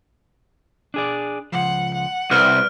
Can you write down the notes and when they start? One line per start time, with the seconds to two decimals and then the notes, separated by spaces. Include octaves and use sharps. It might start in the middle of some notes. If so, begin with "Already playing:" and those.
0.94 D4 G#4 D5
1.52 C#2 F3 F#5
1.94 F#5
2.31 C2 B4 D5 F6